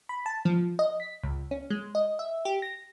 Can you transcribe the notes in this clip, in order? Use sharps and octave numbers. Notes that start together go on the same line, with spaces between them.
B5
A5
F3
D#5
B6
C#2
C#4
G#3
D#5
E5
G4
A#6